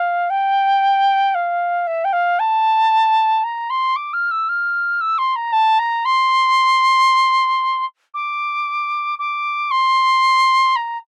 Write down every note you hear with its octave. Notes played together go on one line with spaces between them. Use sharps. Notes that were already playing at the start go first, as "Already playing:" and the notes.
Already playing: F5
G5
F5
E5
G5
F5
A5
A#5
C6
D6
F6
E6
F6
E6
C6
A#5
A5
A#5
C6
D6
D6
C6
A#5